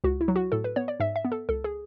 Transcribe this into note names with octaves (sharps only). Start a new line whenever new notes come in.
C#2 F#4
E4
F#3
F#4
A2 A4
B4
B3 C#5
D5
G#2 E5
E5
B3
A4
C#2 A4
G#4